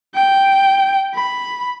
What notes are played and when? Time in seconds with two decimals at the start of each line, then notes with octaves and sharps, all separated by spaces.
0.15 G5
1.14 B5